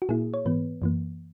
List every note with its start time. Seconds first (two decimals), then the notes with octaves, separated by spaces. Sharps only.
0.02 F#4
0.09 A#2 A#3 E4 G#4
0.34 C#5
0.45 G#2 E3 B3 B4
0.82 F#2 E3 A#3